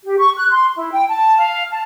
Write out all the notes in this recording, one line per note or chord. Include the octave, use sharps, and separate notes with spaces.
G4
C#6
F#6
C6
E4
G5
A5
F5
A5